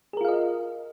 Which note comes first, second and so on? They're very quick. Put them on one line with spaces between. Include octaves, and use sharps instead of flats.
G#4 A#4 F4 F5 D#5